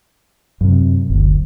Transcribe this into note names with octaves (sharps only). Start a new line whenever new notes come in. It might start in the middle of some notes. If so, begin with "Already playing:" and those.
F#2 C3
F#1 D2